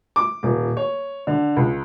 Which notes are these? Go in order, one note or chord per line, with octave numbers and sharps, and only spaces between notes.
D6
D#1
C#5
D3
C#2